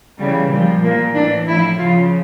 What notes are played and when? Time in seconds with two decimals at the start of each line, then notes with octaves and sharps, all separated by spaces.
0.19 C#3 E3 G3
0.51 A#2 F3 G3
0.83 A#2 F3 A#3
1.15 A2 E3 D4
1.47 A2 F3 E4
1.79 C#3 F3 F4